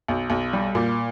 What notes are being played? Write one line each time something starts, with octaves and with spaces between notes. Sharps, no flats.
B1
B1
G3
A#2